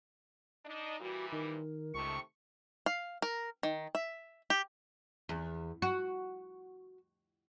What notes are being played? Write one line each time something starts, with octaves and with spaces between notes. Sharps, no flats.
D4 D#4 D#5
A#2 E3 G3 F#4
D#3 A#4
C#2 C3 D#3 A3 C#6
F5
A#4
D#3
E5
G4
E2
F#4